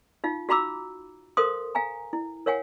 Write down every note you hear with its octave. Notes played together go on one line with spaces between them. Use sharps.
D#4 F4 F5
F#4 F5 A#5 B5 D6 E6
A4 A#4 C5 F5 C6 D#6
F5 G#5 A#5
E4
A#4 C#5 F5 F#5 G#5